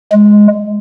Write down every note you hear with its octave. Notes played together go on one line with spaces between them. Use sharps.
G#3